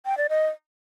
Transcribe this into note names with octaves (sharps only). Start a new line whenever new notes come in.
G5
D5
D#5